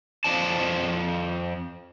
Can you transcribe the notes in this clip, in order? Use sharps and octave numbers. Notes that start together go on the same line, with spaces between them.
F2 F3 D5 A5